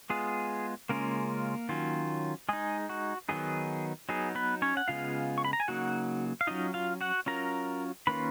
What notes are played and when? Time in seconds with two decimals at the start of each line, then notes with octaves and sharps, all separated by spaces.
0.10 G#3 B3 F4 G#4
0.89 C#3 G#3 A#3 C#4 F4 A#4
1.69 D#3 F#3 C#4 F4
2.49 G#3 D#4 G#4
2.89 F#4
3.29 D#3 F#3 B3 D#4 G#4
4.09 F#3 B3 D#4 G#4
4.35 B3 B4
4.62 C#4 C#5
4.77 F#5
4.88 C#3 G#3 B3 F4 F5
5.38 C#6
5.45 B5
5.53 A#5
5.60 G#5
5.68 C#3 F#3 A#3 D#4 F#4 F#5
6.41 F5
6.47 F#3 C#4 D#4 F4 D#5
6.74 F4 F5
7.01 F#4 F#5
7.26 F#3 C#4 F4 A#4 A#5
8.07 D#3 A#3 C#4 F4 B4 B5